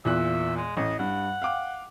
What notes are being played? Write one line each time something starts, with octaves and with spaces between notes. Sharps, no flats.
E2 A#2 E5 F#6
G#3
A1 D#5
G2 F#5
F5 G5 D6